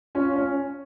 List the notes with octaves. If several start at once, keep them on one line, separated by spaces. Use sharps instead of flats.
C#4 F4
C#4